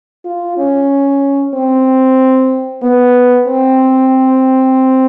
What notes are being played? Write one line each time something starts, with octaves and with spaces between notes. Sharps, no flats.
F4
C#4
C4
B3
C4